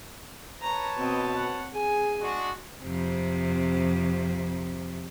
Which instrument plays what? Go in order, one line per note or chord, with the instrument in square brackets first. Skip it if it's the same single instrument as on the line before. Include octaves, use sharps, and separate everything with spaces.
[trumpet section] B4 C#5 A5 [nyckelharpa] A#5
[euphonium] B2 [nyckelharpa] C4 D#5
[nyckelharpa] F#5
[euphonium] G#4 [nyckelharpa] G#5
[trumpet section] G#3 D4 F#4
[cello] F2 C3